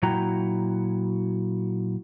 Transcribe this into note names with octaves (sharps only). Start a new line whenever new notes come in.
A#2 F#3 E4 F#4 G5 A#5